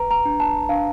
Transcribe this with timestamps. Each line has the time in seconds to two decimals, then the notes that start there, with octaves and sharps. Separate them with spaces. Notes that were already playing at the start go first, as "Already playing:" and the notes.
Already playing: B4 A#5
0.11 A#5
0.25 D4
0.40 A5
0.69 D4 F5